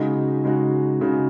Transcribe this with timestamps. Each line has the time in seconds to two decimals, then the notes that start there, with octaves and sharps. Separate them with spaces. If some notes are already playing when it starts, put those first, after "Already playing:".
Already playing: C#3 G#3 D#4 F#4
0.44 C#3 G#3 D#4 F#4
1.01 C#3 G#3 D#4 F#4